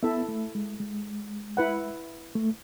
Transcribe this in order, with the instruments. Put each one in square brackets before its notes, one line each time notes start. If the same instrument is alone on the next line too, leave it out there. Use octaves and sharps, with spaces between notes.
[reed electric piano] B3 [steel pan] E4 A4 E5
[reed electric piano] A3
G#3
G#3
[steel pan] E4 B4 F#5
[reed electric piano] A3